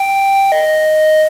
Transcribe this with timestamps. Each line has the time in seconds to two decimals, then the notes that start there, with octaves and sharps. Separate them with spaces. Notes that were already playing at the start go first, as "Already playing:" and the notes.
Already playing: G5
0.52 D#5